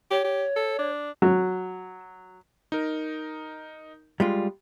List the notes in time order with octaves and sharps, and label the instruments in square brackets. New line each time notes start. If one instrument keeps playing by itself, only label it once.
[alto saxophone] G4 [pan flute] C#5
[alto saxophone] G4
A4
D4
[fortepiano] F#3
[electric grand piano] D#4 A#4
[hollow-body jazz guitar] G3 G#3 F4